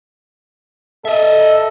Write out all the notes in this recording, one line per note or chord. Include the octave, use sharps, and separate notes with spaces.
A4 D#5 E5